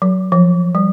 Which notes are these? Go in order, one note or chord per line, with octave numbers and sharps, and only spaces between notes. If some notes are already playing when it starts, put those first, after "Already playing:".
F#3
F3
G3